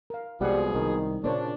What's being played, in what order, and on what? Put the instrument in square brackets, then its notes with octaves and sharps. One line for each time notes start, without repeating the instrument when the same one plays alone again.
[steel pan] A#4 F5
[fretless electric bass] C2 [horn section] B2 F3 G#4 [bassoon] G3 [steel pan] G#3 C5 F#5
[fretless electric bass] C2 [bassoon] D#3
[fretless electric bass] A#2 C#3 [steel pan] A#3 C5 C#5 [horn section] D4